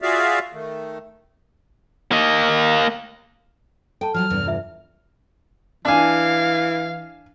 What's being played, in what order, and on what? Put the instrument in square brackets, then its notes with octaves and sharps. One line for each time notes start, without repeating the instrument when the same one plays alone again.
[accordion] F4 F#4 G#4 D5 E5 F5
D#3 A3
[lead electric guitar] A#3 D#5
[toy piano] A4 A5 [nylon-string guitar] G5
[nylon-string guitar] F3 F#3 F4 [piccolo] F6
[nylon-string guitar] E2 G2 C3
[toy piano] F4 E5
[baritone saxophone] E3 [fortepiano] D4 G#5 [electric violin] F5